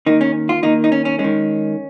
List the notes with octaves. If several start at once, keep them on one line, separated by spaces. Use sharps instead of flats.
D#3 A#3 D#4
C#4
F4
D#3 A#3 D#4
D#4
C#4
C#4
G#3 C#4
D#3